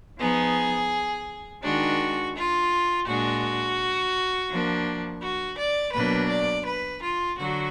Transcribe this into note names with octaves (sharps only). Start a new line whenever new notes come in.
F3 B3 D#4 G#4
D#3 G#3 D4 F#4
F4
A#2 G#3 D4 F#4
F3 A#3 D4
F#4
D5
B2 F#3 A#3 D4 B4
D5
B4
F4
D3 F#3 F#4